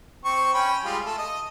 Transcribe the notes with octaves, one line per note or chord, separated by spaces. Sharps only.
C4 C#6
C#4 G5 B5
G3 G#3 F4
A3 A4
D#5